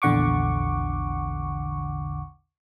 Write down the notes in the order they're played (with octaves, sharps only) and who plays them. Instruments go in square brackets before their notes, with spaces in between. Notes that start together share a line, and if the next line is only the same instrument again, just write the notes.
[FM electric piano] A#1 E2 D3 F#5 C#6 D6